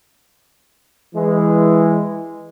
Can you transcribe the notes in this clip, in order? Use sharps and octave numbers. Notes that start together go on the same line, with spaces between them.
E3 G#3